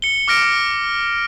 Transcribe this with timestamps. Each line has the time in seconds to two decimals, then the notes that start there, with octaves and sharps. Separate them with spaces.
0.02 C#7 G7
0.28 D6 F6 A#6 D7